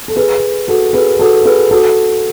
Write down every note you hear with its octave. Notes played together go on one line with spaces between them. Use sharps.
A4
G#4 B4
F#4 A4
G#4 B4
F#4 A4
G#4 B4
F#4 A4